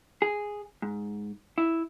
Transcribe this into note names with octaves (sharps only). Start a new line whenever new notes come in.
G#4
G#2
E4